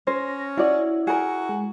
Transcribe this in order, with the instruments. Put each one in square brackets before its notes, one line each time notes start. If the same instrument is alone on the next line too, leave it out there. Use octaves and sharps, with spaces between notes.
[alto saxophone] C#4 [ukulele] C5 [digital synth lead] A#6
[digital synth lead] E4 [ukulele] F#4 D5
[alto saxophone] F#4 [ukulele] G#4 A#4
[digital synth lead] G#3